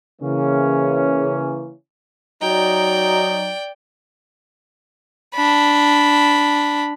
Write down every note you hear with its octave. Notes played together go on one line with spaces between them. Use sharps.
C#3 E3 A#3 C#4
F#3 D#4 D5 G5
D4 B5